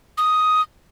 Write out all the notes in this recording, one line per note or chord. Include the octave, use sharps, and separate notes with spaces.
D#6